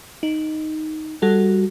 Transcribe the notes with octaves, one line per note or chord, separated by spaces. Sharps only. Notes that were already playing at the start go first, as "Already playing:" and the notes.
D#4
G3 F#4 A4